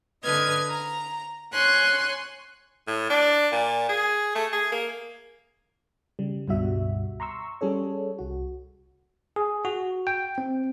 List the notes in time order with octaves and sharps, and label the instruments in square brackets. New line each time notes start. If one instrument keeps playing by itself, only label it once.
[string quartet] D3 B4 D#5 F6 G#6
A#5
C#5 G#5 C6 F#6
[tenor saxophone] A2
D4
A#2
G#4
A3
G#4
A#3
[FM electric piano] C#3 G3
C#2 G2 B2 G3 F#4 E5
A#5 C6 C#6 E6
G3 C#4 G#4 A4 C#5
C2 F#4
[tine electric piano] G#4
F#4
G5
C4